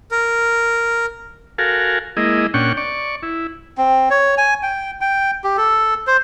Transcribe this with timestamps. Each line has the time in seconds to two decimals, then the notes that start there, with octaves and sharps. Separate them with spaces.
0.11 A#4
1.58 F#4 A4 A#4 F5 G#5
2.17 G#3 A#3 E4 D#5
2.54 A#2 C#4 D4 F#5 G5 C#6
2.77 D5 C#6
3.23 E4
3.78 C4
4.10 C#5
4.38 G#5
4.63 G5
5.01 G5
5.44 G4
5.57 A4
6.07 C5